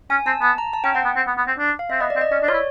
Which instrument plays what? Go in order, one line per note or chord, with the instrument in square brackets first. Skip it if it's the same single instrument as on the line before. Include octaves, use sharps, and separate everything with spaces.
[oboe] C#4 [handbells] G#5
[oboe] C4 [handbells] A5
[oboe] B3 [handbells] A5
[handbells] A#5
A5
[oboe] C#4 [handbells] G5
[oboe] C4 [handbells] F#5
[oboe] B3
C4
B3
B3
C4
D4
[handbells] F5
[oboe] C4 [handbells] E5
[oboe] B3 [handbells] D#5
[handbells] D5
[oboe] C4
[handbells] D#5
[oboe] C#4 [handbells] D5
[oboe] D4
[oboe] F4 [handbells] C#5
[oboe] E4